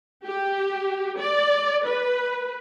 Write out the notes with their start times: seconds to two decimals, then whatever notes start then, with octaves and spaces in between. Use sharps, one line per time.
0.24 G4
1.19 D5
1.87 B4